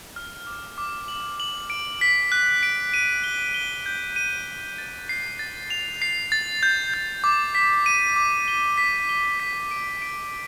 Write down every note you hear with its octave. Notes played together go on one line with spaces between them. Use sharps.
F6
D6
D6
F#7
F#7
D7
B6
F#6
D7
D#7
G7
G7
G6
D#7
D#7
A6
C7
A6
F7
C7
A6
G6
G6
D6
B6
D#7
D6
G7
B6
G7
B6
D7
D7